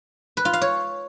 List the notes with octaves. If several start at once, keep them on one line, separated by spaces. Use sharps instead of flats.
B4
F4
F5
C#5